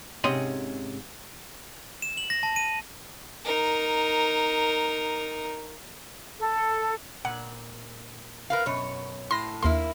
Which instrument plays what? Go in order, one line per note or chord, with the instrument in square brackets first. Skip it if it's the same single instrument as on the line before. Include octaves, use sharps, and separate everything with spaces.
[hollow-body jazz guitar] G#2 C3 C#4 G#4 D#5 C6
[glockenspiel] E7
F#7
A#6
A5
D#7
[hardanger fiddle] D#4 A#4
[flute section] A4
[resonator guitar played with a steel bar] A#2 [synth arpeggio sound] F#5
[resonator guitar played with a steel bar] A#4 B4 F5
F#2 B2 C#5
[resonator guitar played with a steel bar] A2 [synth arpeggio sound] C6 A#6
[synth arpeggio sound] D#2 C6 [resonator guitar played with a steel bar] A#3 E4